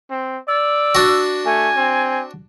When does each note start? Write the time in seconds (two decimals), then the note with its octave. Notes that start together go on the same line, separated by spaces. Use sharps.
0.10 C4
0.48 D5 E6
0.95 D4 F#4
1.46 A3 G#5
1.77 C4